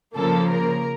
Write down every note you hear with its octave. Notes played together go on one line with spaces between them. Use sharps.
C#3 F3 A#3 A4
A#4